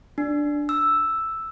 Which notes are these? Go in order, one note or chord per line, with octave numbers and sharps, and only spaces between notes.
D4
E6